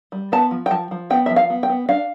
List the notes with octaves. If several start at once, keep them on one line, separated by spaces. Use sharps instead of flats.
G3
B3 A5
F3
G5
F3 A5
F3
B3 G5
F3 E5
F5
B3
G5
B3
D4 F5